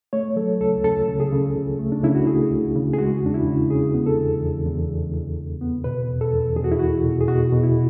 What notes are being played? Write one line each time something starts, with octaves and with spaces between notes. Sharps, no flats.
A3 C#5
F#3 A4
C#2 A4
C#2 A4
C#3
G#4
C#3
C#2
A3
D4
C#3 E4
F#4
A3 G#4
C#2
C#3
G#4
G#3 F#4
E2 D4
E4
C#3
C#3 G#4
B3
A4
E2
E2
E2
E2
E2
E2
B3
B2 B4
E2
A4
E2
E2 G#4
F#4
E4
E2 F#4
B2
G#4
B2 F#4
B2
E4